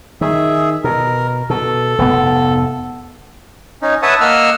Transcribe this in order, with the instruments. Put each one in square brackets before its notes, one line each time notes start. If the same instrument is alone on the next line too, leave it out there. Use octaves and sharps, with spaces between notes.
[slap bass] D#3 [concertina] G#4 E5
[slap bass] B2 [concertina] A#4
[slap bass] B2 [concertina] A4
[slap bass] F1 G#2 B3
[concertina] C#4 D#4
B4 C#5 E5 F#5 A5 D#6
A#3 D#5 F#5 E6 F6